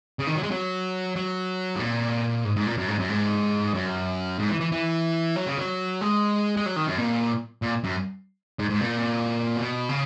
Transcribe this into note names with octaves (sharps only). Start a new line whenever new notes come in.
C#3
D#3
F#3
G#3
F#3
F#3
G#2
A#2
G#2
G#2
A#2
F#2
G#2
F#2
G#2
F#2
G#2
E3
E3
E3
F#3
C#3
F#3
G#3
G#3
F#3
D#3
F#2
A#2
A#2
F#2
G#2
G#2
A#2
B2
C#3